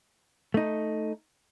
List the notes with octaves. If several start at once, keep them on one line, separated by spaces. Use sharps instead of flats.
A3 D#4